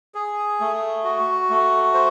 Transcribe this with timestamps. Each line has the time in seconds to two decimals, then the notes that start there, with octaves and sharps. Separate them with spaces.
0.15 G#4
0.61 A3
1.04 F#4
1.50 A3
1.94 C5